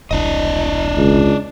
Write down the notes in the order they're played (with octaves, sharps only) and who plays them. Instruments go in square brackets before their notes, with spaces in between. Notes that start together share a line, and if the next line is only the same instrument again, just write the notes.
[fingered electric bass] E1 C2 [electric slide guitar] D4 D#5
[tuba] C#2